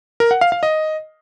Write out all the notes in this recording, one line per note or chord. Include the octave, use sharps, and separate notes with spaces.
A#4
F#5
F5
F5
D#5